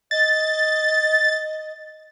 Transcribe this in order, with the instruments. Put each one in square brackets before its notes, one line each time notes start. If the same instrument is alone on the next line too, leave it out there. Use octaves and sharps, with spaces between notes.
[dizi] D#5 [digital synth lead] A6